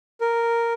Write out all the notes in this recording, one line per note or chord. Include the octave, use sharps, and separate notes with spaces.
A#4